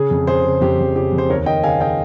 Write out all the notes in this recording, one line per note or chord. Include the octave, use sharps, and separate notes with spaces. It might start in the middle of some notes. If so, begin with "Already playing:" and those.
Already playing: C#3 G#4
F2
C#3 G#4 C5
C#3
F2 G4
F2
C#3 G4
F2
C5
D#2 A#4 C#5
D#2 D#5 G5
C#3 F5 G#5
C#3 D#5 G5